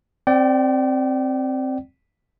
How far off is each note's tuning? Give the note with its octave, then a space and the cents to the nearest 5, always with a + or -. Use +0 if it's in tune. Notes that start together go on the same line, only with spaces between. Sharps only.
C4 +10 D5 +5 G5 -35